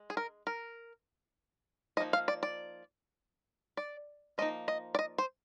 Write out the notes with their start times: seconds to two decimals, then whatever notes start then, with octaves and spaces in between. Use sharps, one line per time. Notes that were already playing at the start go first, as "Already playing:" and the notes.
Already playing: G#3
0.10 G#4
0.17 A#4
0.47 A#4
1.97 F3 A#3 D#4 D#5
2.13 F5
2.28 D5
2.43 D5
3.77 D5
4.38 F3 A#3 D#4 D#5
4.68 D#5
4.95 D5
4.99 D#5
5.18 C5